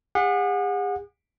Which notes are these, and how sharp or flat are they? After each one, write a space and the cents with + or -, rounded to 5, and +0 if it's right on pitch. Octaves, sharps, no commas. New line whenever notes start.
G#4 -45 F#5 -30